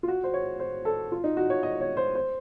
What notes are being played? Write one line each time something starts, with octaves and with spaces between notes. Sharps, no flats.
F4
F#4
C5
C#5
C5
A4
F4
D#4
F#4
C#5
D#5
C#5
C5
C5